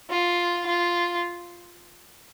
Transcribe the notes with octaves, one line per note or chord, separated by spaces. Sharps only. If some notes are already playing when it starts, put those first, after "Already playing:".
F4
F4